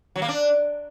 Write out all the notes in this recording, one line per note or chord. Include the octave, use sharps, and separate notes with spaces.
F#3
A#3
D4